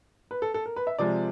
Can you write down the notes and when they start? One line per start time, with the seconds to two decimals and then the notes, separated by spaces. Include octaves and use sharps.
0.31 B4
0.42 A4
0.54 A4
0.66 A#4
0.76 B4
0.87 E5
0.99 C3 F3 G#3 D5